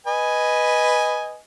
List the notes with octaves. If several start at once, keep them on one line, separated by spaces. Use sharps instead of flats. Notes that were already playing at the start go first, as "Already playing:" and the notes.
B4 D#5 G#5